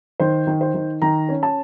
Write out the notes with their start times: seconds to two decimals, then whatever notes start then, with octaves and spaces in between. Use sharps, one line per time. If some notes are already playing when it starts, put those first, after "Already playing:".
0.20 D#3 C5
0.47 D#3
0.61 C5
0.74 D#3
1.02 D#3 A#5
1.29 C#4
1.43 A5